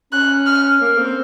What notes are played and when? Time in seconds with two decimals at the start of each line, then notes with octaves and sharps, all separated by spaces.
0.12 C#4 F#6
0.46 F6
0.81 A#3
0.98 C4